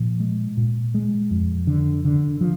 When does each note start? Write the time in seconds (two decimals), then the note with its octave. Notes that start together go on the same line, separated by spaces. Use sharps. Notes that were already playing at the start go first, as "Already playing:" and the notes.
Already playing: A#2 F3
0.20 G#3
0.57 A#2
0.94 G#3
1.31 F2
1.67 D3
2.05 D3
2.41 F3